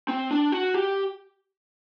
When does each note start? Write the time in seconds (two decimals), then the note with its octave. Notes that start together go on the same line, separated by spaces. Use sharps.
0.08 C4
0.31 D4
0.52 F#4
0.74 G4